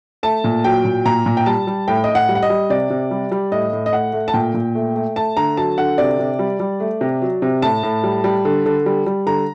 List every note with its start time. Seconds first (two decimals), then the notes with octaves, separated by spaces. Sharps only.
0.23 A3 A5
0.44 A#2
0.64 F#3 G5
0.85 A#2
1.06 A#2 A#5
1.26 A#2
1.37 G5
1.46 G3 A5
1.67 G3
1.88 A2 G5
2.04 A2 D#5
2.15 F#5
2.29 G3
2.35 F#5
2.43 D#5
2.50 G3
2.70 C3 D5
2.90 C3
3.11 G3
3.32 G3
3.52 A2 D#5
3.73 A2
3.86 D#5
3.93 A3 F#5
4.13 A3
4.28 A5
4.34 A#2 G5
4.54 A#2
4.75 A3
4.96 A3
5.16 A3 A5
5.37 D3 A#5
5.57 F#3 A5
5.78 D3 F#5
5.98 C3 D5
6.19 C3
6.39 G3
6.60 G3
6.80 A3
7.01 C3
7.22 F#3
7.42 C3
7.62 A2 A5
7.83 A2
8.04 G3
8.24 G3
8.45 D3
8.66 D3
8.86 G3
9.06 G3
9.26 D3 A#5